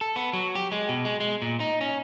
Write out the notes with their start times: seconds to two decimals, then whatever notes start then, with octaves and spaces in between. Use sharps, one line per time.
0.01 A4
0.16 B3
0.33 F#3
0.55 G4
0.72 G#3
0.89 B2
1.05 G#3
1.20 G#3
1.42 A#2
1.60 D#4
1.81 C#4